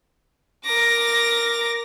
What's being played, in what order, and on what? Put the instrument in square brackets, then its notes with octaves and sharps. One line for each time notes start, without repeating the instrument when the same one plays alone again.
[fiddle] A#4 D6 [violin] A#6